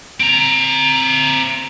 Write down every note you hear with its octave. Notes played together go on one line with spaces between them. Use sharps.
C4 A#5